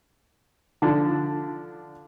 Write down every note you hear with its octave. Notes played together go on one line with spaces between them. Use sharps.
D3 F3 D4